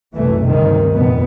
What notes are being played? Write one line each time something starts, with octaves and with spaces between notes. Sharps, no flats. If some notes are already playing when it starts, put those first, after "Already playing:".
F#1 C2 A#2 E3 A3
D2 G2 C3 D#3
F1 F2 A#2 D3 G3 B3